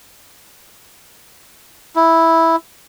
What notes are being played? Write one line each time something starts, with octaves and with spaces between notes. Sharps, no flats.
E4